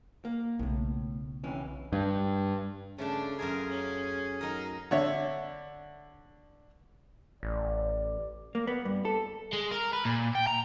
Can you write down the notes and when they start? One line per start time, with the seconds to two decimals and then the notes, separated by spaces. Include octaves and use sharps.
0.25 A#3
0.59 B1 A2 C#3
1.44 C3 E3 C#4
1.93 G2
2.98 C#3 A3 D4 A5
3.39 F#2 F4 G#4 A#4 D5
3.70 C#4
4.41 F#3 D#4 A#4
4.91 D3 C#5 E5
7.43 A1 D5
8.55 A#3
8.67 B3
8.85 G2
9.05 A4
9.53 G#3
9.71 A#4
9.93 B4
10.05 A#2
10.35 G5
10.47 A#5